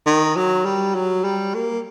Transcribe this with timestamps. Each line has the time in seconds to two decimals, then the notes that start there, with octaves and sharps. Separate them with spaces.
0.06 D#3
0.36 F#3
0.65 G3
0.95 F#3
1.24 G3
1.54 A#3